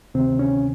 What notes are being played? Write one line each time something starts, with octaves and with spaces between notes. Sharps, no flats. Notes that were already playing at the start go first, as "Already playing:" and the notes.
D2 C3 D#3 C4
C#4